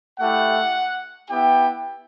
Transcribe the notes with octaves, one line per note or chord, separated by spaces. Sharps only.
A3 E4 G4 F#5
B3 E4 G4 G5